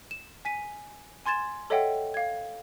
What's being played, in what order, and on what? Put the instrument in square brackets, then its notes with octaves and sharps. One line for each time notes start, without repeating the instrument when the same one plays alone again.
[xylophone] E7
G#5 B6 D#7
G#5 C6 G#6 A6 E7
A4 C#5 D#5 E5 F#5 G5
F5 G#6